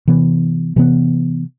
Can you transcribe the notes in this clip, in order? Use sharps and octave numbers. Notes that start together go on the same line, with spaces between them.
C3 E3 B3
C3 E3 B3